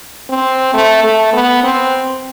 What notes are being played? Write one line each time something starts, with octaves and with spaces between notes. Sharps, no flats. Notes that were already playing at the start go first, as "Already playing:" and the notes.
C4
A3
A3
B3
C4